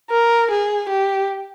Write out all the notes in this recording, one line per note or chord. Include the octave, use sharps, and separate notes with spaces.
A#4
G#4
G4